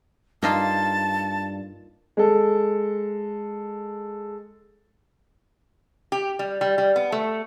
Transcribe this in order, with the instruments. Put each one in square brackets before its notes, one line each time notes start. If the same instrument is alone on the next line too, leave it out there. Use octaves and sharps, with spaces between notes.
[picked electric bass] G2 [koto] A#3 D#4 F4 [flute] A5
[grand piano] G#3 A4
[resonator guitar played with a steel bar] G4
G3
G3
G3
B3
A3